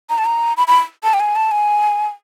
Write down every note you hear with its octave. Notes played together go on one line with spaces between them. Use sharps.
A#5
A5
A#5
B5
B5
A5
G5
G#5
A5
G#5